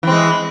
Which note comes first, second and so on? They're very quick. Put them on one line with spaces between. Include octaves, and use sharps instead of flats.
E3 C4 G#3